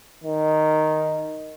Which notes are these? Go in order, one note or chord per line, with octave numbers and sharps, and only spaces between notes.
D#3